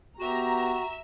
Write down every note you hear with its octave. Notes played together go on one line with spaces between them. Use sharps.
B3 F#4 G4 E5 A#5 E7